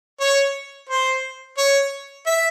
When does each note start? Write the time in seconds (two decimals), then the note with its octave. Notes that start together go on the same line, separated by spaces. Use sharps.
0.20 C#5
0.89 C5
1.57 C#5
2.27 E5